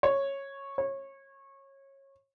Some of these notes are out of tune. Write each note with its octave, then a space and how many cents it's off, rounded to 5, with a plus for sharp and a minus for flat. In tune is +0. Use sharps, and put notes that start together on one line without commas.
C#5 -10
C#5 -25